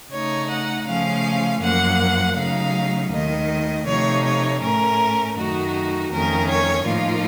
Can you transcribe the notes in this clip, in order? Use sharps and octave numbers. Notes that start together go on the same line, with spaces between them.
C#3 A3 D#4 C#5
F#5
C#3 F3 A3 C#4 F5
F#2 F3 A#3 F#5
C#3 F#3 A3 D#4 F5
D#2 D#3 A3 D#5
C3 F3 A3 D#4 C#5
C#5
A2 A3 C#4 A#4
F#2 D#3 A3 D#4 F#4
F2 D#3 A3 C#4 A#4
C#5
A2 F3 A#3 D#4 F4